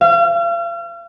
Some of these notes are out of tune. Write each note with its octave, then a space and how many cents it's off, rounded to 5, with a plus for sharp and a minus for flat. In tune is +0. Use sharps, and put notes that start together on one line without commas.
F5 -40